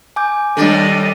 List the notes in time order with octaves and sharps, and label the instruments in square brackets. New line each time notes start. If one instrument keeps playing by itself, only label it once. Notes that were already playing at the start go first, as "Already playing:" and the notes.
[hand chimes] G#5 D6 G6
[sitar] D#2 D4 [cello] G3 [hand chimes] A4 [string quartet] D#5